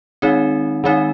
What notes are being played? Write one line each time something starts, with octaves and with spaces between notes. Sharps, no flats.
D#3 G#3 C4 D#4
D#3 G#3 C4 D#4